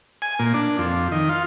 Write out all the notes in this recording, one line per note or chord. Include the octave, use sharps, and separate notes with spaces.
G#5
A#2
D4
F2
D#3
F4